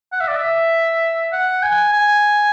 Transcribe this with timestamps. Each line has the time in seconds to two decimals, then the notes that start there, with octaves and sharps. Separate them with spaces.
0.13 F#5
0.21 E5
0.28 D5
0.36 E5
1.32 F#5
1.63 G#5
1.93 G#5